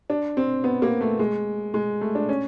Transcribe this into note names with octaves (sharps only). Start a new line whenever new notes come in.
D4
C4
B3
A#3
A3
G#3
G#3
A3
D4
C#4